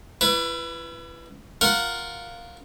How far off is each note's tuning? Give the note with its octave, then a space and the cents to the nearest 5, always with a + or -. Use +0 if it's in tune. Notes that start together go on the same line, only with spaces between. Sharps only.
E4 +40 B4 +0
F4 +0 A#4 +0 F#5 +0